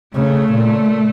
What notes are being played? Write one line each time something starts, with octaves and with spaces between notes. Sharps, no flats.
C#3 A3
A#2